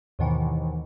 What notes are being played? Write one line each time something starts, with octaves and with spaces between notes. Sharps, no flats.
D#2 G#2 B2 D#3 E3